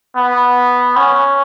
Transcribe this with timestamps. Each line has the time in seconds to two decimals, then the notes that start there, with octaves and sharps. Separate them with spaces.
0.16 B3
0.96 C#4